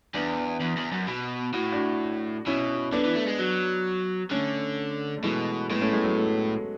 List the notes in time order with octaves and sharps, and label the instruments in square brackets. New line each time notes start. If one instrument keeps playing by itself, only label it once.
[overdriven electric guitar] E2 [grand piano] B3 D4
[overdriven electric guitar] E2
E2
F#2
B2
[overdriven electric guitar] A2 [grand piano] F#4
[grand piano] D4 F#4
[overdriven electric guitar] B2 [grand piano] C#4 E4
[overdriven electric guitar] D3 [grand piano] B3 D4
[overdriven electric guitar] E3
A3
G#3
F#3
[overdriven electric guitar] D3 [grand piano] A3 C#4
[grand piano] A3
[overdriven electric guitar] B2 [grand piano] E3 G#3
[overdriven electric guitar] A2 [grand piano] G#3 B3
[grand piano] A3 C#4
G#3 B3
F#3 A3
F#3 A3